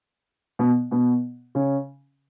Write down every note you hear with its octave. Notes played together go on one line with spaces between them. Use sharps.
B2 B3
B2 B3
C#3 C#4